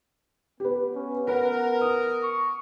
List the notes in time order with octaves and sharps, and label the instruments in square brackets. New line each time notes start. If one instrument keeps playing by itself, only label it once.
[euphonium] B3 [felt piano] G4 B4
[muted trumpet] C#4
[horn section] A#4 [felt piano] B4 [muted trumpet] F#5
[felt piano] D#6
[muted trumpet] C#6